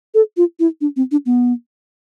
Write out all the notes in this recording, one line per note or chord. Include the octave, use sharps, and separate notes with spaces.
A4
F4
E4
D4
C4
D4
B3